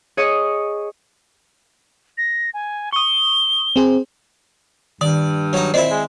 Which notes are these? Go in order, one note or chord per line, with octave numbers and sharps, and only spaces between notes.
G#4 C#5 D#5
A#6
G#5
C#6 D#6 G7
C4 G#4 C5
G2 D#3 D5
F#3 D#4
A#2 C4 E4 D5 D#5
G#3